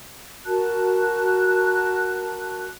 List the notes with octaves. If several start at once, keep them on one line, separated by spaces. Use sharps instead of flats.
F#4 A#4 A5 F#6